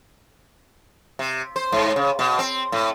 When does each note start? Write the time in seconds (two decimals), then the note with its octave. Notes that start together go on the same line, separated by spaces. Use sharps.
1.19 C3
1.56 C5
1.72 G#2
1.96 C#3
2.19 B2
2.39 C4
2.72 A2